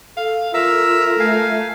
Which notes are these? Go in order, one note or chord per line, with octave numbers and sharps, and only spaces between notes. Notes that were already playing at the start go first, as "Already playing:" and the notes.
A4 F5
F4 A#4 E5 E6
A3 F5 G#5